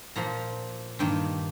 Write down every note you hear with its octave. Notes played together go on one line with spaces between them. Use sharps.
A#2 F3 A#3 A#5
G2 D#3 A#3 G5